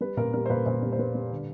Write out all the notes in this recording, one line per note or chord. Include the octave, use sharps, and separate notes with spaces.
G3 B4
A#2 A#4
G3 A#4
C5
A#2 B4
A#2 C5
G3
C5
G3 B4
G3
D3